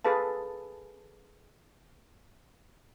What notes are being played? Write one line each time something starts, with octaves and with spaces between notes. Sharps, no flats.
G#4 A4 B4 F5 A5